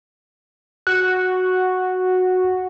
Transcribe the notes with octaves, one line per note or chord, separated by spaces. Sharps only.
F#4 F#6